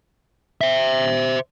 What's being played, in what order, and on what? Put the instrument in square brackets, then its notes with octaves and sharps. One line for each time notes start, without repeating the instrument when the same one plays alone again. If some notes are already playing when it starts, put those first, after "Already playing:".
[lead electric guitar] C5 E5